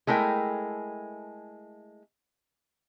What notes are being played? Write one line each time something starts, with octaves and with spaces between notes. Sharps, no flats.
G#3 A3 E4 A#4 G5